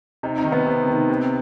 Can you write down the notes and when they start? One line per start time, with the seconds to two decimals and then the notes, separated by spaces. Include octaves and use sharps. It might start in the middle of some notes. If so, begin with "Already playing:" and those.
0.23 C3 D#4
0.38 D#4
0.45 D#3
0.52 B3
0.67 C3
0.88 D#3
1.09 C3